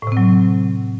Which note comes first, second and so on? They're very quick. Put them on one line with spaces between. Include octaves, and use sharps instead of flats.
A2 C3 C4 F#3